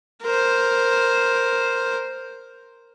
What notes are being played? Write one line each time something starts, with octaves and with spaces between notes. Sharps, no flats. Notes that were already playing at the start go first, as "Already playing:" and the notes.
A#4 C5